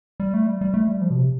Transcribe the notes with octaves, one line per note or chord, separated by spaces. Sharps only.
G3
A3
G3
G3
A3
G3
F3
B2
C3